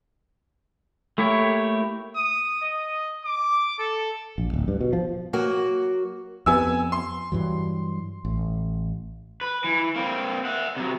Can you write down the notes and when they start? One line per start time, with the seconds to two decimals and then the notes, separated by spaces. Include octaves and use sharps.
1.18 A3 A#3 E4 G4 C#5
2.16 D#6
2.62 D#5
3.25 D6
3.79 A4
4.38 A#1
4.54 D1
4.68 G2
4.81 B2
4.93 F3
5.33 F#3 A#3 F#4
6.46 F2 B3 G#5 E6
6.92 C6
7.32 G2 E3 F#3
8.25 A1
9.41 B4
9.64 E3
9.96 A#3 C4
10.45 E5 F#5
10.77 C3 F#3